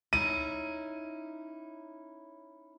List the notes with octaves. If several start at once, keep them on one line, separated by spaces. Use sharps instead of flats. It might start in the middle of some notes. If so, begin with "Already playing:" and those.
C#4 D#4 E4 D#7